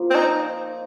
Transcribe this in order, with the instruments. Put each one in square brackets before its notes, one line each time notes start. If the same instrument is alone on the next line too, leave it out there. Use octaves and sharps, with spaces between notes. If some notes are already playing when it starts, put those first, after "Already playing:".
Already playing: [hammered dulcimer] F3 A#3
[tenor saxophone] C4
D#4